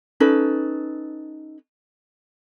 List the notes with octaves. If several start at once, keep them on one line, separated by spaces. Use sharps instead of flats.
C#4 D#4 A4 B4